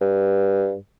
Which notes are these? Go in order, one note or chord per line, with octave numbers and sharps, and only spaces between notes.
G2